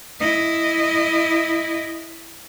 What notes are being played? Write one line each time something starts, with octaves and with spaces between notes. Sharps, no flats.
E4 D#5